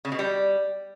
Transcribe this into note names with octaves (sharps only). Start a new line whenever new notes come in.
C#3
B2
G3